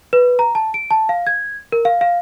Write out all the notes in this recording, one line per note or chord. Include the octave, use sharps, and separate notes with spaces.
B4
A#5
A5
D7
A5
F5
G#6
A#4
F5
F5